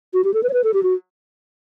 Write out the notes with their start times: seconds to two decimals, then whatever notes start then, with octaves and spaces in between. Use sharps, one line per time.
0.14 F#4
0.24 G4
0.34 A4
0.43 B4
0.49 C#5
0.53 B4
0.64 A4
0.74 G4
0.83 F#4